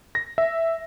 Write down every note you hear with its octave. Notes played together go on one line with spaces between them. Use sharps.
A#6
E5